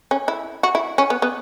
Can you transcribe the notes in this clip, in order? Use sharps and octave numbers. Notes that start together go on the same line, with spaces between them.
C#4
E4
F#4
E4
C#4
B3
B3